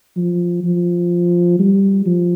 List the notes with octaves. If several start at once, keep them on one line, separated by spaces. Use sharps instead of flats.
F3
F3
G3
F3